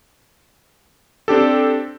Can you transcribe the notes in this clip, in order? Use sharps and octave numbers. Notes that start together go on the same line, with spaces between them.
C4 D4 G4 A4